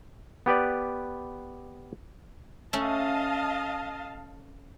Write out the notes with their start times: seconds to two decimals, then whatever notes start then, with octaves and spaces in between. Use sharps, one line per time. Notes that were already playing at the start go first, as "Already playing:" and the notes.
0.46 B3 G4 B4 D5
2.73 A3 C#4 D#5 F5 A5